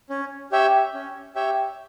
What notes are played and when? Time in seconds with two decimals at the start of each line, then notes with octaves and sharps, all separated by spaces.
0.10 C#4
0.52 G4 C#5 E5 G5
0.94 C#4
1.35 G4 C#5 E5 G5